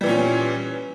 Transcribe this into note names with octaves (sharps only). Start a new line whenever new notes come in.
A#2 E3 G3 C#4